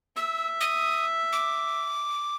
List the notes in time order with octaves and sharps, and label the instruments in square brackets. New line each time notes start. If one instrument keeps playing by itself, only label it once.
[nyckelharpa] E5 [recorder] E6
[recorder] D#6
D6